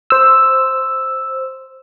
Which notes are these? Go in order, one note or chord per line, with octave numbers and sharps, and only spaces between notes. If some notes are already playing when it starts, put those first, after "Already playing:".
C5 E6